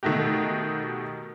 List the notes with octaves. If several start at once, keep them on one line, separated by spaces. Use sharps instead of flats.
B2 D#3 A3 D#4 F#4 G4